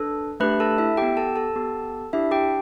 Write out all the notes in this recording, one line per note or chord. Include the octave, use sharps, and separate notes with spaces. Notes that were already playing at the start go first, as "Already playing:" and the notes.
Already playing: D4 A4 B4
A3 D4 G4 B4 B5
A4 A5
E4 E5
B3 G4 G5
A4 A5
A4 A5
B3 G4
D4 E4 G4 E5
G4 G5